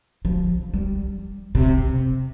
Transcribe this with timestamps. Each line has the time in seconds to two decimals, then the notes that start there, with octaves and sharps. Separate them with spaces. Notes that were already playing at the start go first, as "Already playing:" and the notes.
0.25 F3
0.74 G3
1.55 C3